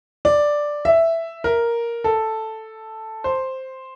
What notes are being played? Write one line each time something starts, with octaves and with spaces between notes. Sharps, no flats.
D5
E5
A#4
A4
C5